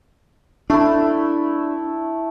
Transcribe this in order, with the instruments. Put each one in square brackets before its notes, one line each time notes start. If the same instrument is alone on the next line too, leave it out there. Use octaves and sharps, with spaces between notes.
[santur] A3 E4 [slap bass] D4